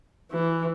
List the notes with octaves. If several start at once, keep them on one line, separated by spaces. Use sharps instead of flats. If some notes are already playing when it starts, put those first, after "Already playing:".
E3